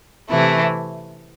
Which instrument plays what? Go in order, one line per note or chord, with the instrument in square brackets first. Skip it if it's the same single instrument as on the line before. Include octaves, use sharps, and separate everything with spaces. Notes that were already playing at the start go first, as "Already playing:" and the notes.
[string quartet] C3 E3 A3 E4